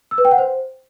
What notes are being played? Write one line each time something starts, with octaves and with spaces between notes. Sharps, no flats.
E6
B4
G5
F#5
C5